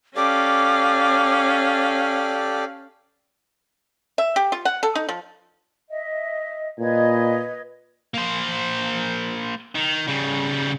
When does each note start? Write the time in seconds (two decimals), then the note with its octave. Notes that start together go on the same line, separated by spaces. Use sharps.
0.16 C#4 G4 A4 D5 F5 D6
4.18 E5
4.36 G4
4.52 F4
4.65 F#5
4.83 A4
4.95 D#4
5.09 F3
5.90 D#5 E5
6.79 A#2 B4 D#5 G#6
8.14 A#3 C5
9.75 D#3
10.07 C#3 G3